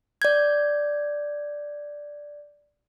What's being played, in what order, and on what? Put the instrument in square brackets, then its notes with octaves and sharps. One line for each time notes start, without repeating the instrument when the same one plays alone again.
[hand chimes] D5 G6 G#6